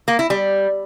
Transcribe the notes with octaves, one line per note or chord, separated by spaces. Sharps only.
A#3
E4
G3